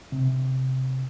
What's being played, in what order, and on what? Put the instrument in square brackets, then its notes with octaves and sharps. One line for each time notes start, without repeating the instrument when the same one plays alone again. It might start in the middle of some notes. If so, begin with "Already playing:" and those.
[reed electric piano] C3